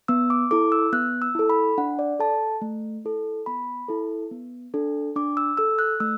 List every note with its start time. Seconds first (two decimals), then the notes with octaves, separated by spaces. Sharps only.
0.08 B3 E6
0.30 D6
0.51 E4 A4 D6
0.72 E6
0.92 B3 F#6
1.22 E6
1.35 E4 A4
1.50 B5
1.78 D4 F#5
1.99 D5
2.19 A4 A5
2.62 A3
3.05 E4 A4
3.46 B3 B5
3.88 E4 A4
4.31 B3
4.74 D4 A4
5.16 D4 D6
5.37 E6
5.57 A4 E6
5.79 F#6
6.00 A3 E6